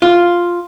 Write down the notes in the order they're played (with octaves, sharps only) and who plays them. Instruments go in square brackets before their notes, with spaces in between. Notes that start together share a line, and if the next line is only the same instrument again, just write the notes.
[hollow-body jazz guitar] F4